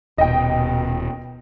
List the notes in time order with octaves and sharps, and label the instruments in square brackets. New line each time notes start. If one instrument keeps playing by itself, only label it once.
[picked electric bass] D#1 [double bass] B2 [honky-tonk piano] D#5 G5